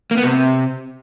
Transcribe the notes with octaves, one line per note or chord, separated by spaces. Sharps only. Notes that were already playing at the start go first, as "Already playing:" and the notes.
A#3
B3
C3